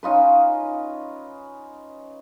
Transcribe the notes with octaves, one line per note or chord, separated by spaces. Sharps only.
C#4 D#4 F4 B4